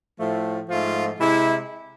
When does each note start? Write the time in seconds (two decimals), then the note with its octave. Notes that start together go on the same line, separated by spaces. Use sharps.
0.19 A2 F3 A3
0.69 G#2 F3 A3 F4
1.19 C3 G#3 E4